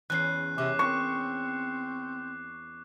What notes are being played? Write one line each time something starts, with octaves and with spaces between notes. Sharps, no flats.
E2 C#4 F#6 C7
C3 C#4 D6
C4 C#6